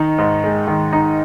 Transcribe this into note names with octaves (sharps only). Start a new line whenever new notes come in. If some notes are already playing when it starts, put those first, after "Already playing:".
Already playing: D#3 D#4
G#2
G#3
D#3
D#4